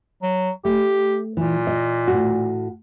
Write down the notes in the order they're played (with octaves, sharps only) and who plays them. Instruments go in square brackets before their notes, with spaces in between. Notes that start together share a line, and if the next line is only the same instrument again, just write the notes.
[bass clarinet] F#3
[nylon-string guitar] A3 [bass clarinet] G4
[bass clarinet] A#2 [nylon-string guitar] E3
[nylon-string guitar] D#5
A2 F#4